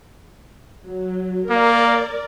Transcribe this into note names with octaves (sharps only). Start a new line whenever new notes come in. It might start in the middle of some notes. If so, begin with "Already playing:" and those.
F#3
A#3 A#4 D5